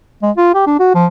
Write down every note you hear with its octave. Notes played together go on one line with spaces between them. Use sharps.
G#3
F4
G4
D4
F#4
F3